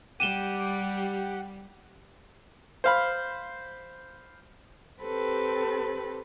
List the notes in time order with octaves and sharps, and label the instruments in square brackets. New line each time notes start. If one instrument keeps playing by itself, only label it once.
[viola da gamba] G3 [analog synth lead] G4 [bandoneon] F#5 [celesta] D#7 E7 G7
[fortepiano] C5 F5 B5
[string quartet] C4 G4 A4 B4